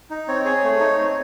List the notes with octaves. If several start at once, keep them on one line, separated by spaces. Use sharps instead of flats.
D#4
C4 C#5
G#4 C#5
A3
D#4
C4